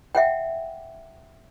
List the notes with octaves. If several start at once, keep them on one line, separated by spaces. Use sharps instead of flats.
E5 F#5 G5